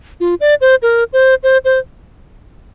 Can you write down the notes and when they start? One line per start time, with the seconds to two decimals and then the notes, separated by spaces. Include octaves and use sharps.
0.20 F4
0.40 D5
0.61 C5
0.82 A#4
1.13 C5
1.43 C5
1.65 C5